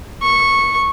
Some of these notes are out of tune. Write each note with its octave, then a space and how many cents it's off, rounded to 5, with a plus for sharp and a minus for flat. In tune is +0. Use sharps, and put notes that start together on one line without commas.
C#6 -10